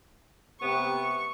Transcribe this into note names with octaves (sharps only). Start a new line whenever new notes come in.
C3 B3 C#6